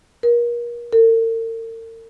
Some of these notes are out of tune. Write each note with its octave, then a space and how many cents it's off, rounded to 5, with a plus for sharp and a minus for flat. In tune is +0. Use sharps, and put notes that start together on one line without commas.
A#4 +35
A#4 -45